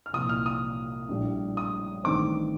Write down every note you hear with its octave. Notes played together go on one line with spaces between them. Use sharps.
F6
C2 A#2 F3 D#6
F6
D#6
A#1 A2 G3
D#6
A1 G2 D#3 A3 C4 D6